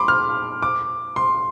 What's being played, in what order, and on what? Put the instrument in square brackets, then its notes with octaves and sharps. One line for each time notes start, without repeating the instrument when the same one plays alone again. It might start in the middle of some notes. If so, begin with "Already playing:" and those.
Already playing: [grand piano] B5 C6 D6
F6
D6
C6